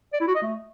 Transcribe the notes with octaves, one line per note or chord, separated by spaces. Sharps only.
D5
E4
F#4
D#5
A3